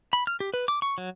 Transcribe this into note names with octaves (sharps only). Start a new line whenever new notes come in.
B5
F6
G4
B4
D6
C#6
F#3